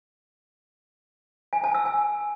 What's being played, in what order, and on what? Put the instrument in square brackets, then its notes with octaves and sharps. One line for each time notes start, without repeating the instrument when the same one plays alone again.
[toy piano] G#5
A5
E6
G#5